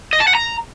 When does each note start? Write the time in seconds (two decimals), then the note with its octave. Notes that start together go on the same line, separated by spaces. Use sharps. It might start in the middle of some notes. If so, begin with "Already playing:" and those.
0.13 D#5
0.20 A5
0.27 F#5
0.35 A#5